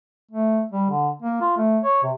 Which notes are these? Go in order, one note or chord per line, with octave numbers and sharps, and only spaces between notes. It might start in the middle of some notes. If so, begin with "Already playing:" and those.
A3
G3
D3
A#3
F4
A3
C#5
C3